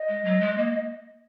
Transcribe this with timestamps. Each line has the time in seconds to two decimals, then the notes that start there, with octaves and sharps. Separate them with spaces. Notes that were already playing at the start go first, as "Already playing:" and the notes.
Already playing: D#5
0.09 G#3
0.25 F#3
0.40 G#3
0.57 A#3